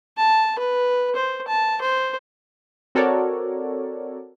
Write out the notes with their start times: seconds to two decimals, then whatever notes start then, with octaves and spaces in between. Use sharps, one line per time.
0.17 A5
0.58 B4
1.15 C5
1.47 A5
1.81 C5
2.95 C4 F#4 A4 A#4 C#5 D5